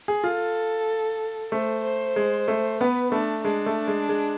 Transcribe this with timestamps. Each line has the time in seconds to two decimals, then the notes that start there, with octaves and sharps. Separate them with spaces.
0.08 G#4
0.24 F4 A4
1.52 A3 C5
1.84 C5
2.16 G#3
2.48 A3
2.81 B3 B4
3.12 A3 D4
3.45 G#3 D4
3.66 A3
3.88 G#3
4.09 G#3